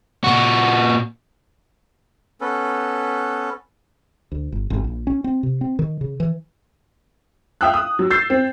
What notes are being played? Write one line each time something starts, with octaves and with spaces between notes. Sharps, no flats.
A#2 F#4
B3 C#4 A4 B4
D2
G1
G#1
A#1
C#4
C4
C3
C4
D#3
C#3
E3
E5 F5 G5 D#6 E6 F#6
D#6
F#3 E6
E6 G6 A6 C7
C4